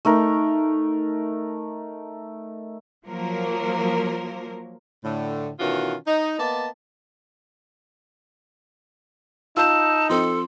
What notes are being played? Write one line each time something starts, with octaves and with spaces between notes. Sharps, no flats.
A3 D#4 A#4
F3 F#3 A#3 A#4
A2 D3
B2 D#3 E3 C#4 F4 F#4
D#4
A#3 B3 D5 D#5 A5
D#4 F4 A5 E6 G6
F3 C4 A4 C6